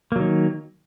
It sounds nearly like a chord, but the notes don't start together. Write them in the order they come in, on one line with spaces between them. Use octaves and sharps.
A#3 F#3 D#3